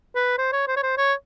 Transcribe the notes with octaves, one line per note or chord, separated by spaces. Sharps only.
B4
C5
C#5
C5
C#5
C5
C#5